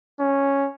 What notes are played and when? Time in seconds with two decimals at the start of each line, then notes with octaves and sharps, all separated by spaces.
0.20 C#4